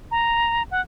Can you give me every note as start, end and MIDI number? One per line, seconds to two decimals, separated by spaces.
0.11 0.63 82
0.71 0.81 78